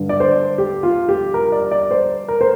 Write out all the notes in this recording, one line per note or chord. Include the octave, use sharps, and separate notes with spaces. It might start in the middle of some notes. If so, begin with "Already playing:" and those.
Already playing: G2 D3
D5
C5
G4
F4
G4
A#4
D5
D5
C5
A#4
C5